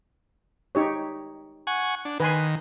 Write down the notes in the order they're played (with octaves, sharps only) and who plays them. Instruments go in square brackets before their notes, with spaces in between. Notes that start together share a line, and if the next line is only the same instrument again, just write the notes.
[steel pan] D#4 G4 C#5
[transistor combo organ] F#5 G#5 C#6
D4
[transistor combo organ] D#3 [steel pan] B4 G#5 C6